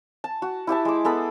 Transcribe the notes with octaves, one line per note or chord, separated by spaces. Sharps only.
A5
F#4
E4 G4 E5 A5
G#3 D6
B3 G#4 A4 B5